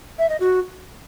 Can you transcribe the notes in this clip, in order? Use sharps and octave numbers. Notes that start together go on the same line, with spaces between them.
E5
D#5
F#4